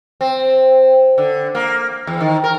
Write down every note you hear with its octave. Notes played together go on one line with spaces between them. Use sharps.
C4
D3
A#3
E2
D#3
A#4